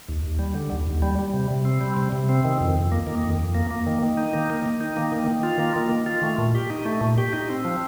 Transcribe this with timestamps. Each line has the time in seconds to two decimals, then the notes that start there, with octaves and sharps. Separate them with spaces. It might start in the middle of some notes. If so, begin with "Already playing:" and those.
0.08 D#2
0.23 D#2
0.39 G3
0.55 D3
0.72 D#2
0.87 D#2
1.02 G3
1.19 G3
1.33 C3
1.50 C3
1.65 C4
1.81 G3
1.97 C3
2.12 C3
2.29 C4
2.45 D#3
2.60 F2
2.75 F2
2.92 A#3
3.07 D#3
3.23 F2
3.40 F2
3.55 A#3
3.71 A#3
3.86 D#3
4.02 D#3
4.17 D#4
4.33 A#3
4.50 D#3
4.66 D#3
4.81 D#4
4.97 A#3
5.12 D#3
5.28 D#3
5.43 F4
5.59 A#3
5.76 D#3
5.92 D#3
6.06 F4
6.23 A3
6.38 A#2
6.55 G4
6.70 D#4
6.85 A3
7.01 A#2
7.18 G4
7.33 D#4
7.49 C4
7.64 F3